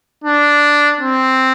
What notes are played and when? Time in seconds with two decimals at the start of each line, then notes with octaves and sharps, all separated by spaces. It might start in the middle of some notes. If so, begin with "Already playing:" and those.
0.24 D4
1.01 C4